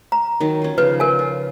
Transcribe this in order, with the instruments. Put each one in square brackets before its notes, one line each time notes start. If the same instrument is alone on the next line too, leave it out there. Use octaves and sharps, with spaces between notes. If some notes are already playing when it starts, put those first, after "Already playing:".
[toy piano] A#5
[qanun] D#3 F#3 A5
C#4 F4
[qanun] C#3 F3 C5 [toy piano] B4
[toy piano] A#4 G#5
[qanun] F4